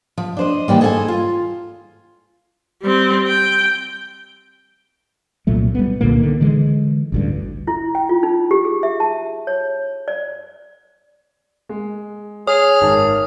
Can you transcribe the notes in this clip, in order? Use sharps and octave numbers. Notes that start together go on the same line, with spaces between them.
F3
D4 C5 D#5
D#3 E3 G3 A#3
G#4 A4 C5 F#5 G#5
F4
G3 C4
G5
C2 A#2 F#3 A3
G3 B3
C2 A#2 D3 A#3
D3 D#3
D3 E3 G#3
A1 D2 G2
E4
G5
F4
D#4
G4
G#4
E5
A5
C#5
D5
G#3
G#4 C#5 D#6 F6
G#1 D#3 A5